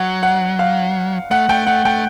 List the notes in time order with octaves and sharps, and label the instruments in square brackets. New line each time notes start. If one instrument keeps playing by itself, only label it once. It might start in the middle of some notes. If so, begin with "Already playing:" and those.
Already playing: [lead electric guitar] F#3 [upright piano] F#5
[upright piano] F#5
F5
[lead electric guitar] A3 [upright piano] F#5
[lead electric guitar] A3 [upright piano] G5
[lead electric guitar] A3 [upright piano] F#5
[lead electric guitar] A3 [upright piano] G5